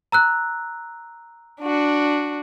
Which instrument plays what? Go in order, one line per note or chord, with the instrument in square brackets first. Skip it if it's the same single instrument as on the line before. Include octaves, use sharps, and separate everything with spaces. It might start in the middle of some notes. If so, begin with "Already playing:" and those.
[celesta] A#5 E6 F#6
[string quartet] D4 F#4